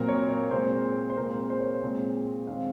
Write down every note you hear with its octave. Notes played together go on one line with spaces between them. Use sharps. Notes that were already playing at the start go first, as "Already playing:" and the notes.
Already playing: A#2 F#3 C4 A#4
C#5
C#5
A#2 G#3 C4 C5
C5
A#2 G#3 C4 A#4
C5
C#5
A#2 G#3 C4
D#3 G#3 C4 F5